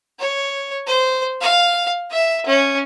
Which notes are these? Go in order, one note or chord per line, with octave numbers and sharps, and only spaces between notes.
C#5
C5
F5
E5
C#4